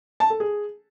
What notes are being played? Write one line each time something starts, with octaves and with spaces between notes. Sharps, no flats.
A5
A4
G#4